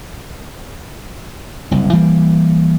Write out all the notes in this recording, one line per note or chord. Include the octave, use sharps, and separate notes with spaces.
F#1 C2
E3 G3 A#3